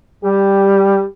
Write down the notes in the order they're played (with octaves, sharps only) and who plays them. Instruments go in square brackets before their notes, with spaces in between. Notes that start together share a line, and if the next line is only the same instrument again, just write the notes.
[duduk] G3 [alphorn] G4